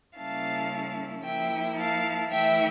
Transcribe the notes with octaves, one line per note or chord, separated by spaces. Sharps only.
C#3 G3 A#3 C#4 E4 F5 A5
F3 A#3 E4 E5 G5
F5 A5
E3 A3 E4 E5 G5